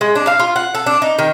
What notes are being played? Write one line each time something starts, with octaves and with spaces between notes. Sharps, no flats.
G#3
D4
F5
F4
F#5
A4
D4
D#4
D#3